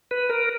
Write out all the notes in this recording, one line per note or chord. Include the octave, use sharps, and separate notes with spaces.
B4
A#4